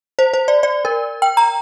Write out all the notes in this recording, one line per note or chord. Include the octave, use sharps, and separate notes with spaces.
C5
C5
D5
D5
A#4
G5
A#5